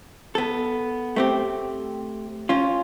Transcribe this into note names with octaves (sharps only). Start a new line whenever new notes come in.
B3 A4
A3 C4 G4
C#4 F4